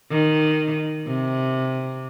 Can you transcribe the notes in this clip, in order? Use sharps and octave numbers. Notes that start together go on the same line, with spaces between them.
D#3
C3